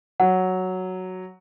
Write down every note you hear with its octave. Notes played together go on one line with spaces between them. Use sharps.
F#3 F#5